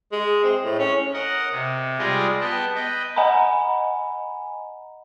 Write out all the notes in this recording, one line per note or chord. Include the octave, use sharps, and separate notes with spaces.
G#3
C4
A2
C#4
A#4 D#5 F#5
C3
G3 G#3 F4 G#4 D5 D#5
B3 G5 A5
B4 D#5 G5
D#5 F#5 G#5 A#5 B5